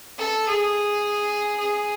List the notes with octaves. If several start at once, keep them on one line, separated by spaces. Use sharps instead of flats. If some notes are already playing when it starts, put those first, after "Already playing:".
A4
G#4
G#4